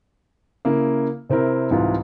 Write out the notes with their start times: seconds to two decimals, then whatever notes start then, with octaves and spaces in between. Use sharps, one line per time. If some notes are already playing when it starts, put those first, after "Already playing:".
0.65 C#3 A#3 E4
1.30 C3 C4 E4 A#4
1.71 C2 G#2 E3 F4